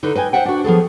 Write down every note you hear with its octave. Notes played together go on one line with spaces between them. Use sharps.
D3 D#4 E4 B4
B4 D#5 G5 G#5
C5 D5 E5 F#5 G5
D4 F#4
F3 B3 G#4 A4